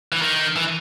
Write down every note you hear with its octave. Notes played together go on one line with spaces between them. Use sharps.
E3
D#3
E3